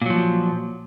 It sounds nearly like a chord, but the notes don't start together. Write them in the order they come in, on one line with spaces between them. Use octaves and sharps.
A#2 F#3 F3